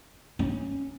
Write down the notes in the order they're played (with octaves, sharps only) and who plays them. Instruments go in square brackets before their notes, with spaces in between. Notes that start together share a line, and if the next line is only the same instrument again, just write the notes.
[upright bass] C#4